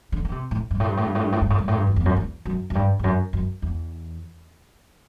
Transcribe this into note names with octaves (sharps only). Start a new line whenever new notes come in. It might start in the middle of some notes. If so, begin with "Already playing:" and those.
D3
D3
C3
A2
G2
A2
G2
A2
G2
A2
G2
A2
G2
A2
G2
A2
G2
F#2
E2
F#2
E2
F#2
F#2
G2
E2
F#2
F#2
E2